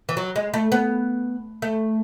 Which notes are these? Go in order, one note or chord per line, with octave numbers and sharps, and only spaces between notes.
E3
F#3
G#3
A3
B3
A3